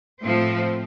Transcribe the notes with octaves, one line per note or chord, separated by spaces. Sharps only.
A2 F3 C4